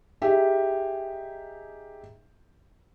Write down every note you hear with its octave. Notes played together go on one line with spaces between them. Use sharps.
D#4 G4 G#4 E5